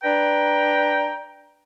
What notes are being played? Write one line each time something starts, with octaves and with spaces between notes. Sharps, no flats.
D4 B4 G5 A#5